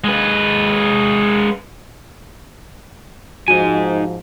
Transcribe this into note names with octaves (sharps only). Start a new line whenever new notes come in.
G#3 B4
G#2 F3 D#4 F#4 G#5 D#7